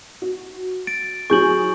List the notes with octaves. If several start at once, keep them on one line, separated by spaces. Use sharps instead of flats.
F#4
A6 D7
F#3 G#4 C#6 G6 F#7